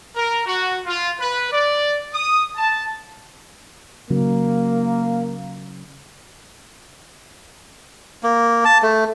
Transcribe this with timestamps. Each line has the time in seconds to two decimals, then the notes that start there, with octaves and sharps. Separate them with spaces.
0.16 A#4
0.46 F#4
0.86 F4
1.19 B4
1.51 D5
2.13 D#6
2.55 A5
4.10 C#3 F#3 A#3
8.23 A#3
8.65 A5
8.82 A3